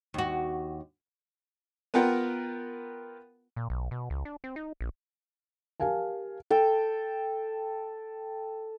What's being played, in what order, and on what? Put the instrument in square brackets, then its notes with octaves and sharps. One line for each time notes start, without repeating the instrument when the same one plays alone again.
[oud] D#2 F#4
[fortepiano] B3 F4 A#4 F#5 G5
[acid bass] A#2
B1
B2
C#2
D4
C4
D#4
A#1
[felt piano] G4 A#4 F5 G#5 A5
[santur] A4 G5